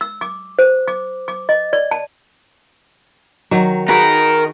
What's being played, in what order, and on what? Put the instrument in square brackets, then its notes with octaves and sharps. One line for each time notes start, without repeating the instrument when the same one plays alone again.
[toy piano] E6
D6
C5
D6
D6
D#5
D5
A5
[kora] D#3 F#3
[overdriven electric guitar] D#4 A#4 [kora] F#4 G#4 B4